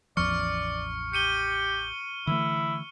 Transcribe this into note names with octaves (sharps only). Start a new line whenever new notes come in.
A1 E2 F3 D5 C#6 F6 C#7
G4 C#7 D#7 G7
D3 E3 A3 E4